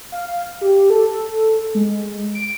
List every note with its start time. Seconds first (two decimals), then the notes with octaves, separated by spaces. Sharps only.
0.12 F5
0.61 G4
0.90 A4
1.75 G#3
2.35 D7